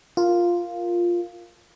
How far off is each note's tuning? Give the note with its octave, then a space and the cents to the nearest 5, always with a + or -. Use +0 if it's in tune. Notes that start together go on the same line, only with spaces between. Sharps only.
F4 +0 A#4 +0